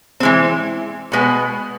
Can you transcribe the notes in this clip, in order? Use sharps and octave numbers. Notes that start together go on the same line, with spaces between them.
E3 G#3 C4
B2 G#3 B3